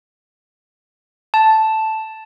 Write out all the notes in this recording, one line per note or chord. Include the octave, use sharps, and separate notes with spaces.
A5